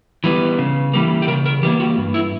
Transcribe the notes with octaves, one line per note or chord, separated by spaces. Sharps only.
E3 G3 B3
C#3
E3 G3 A#3
G4
C#3 A#4
A#4
E3 G3 A#3 G4
F#4
G2
E4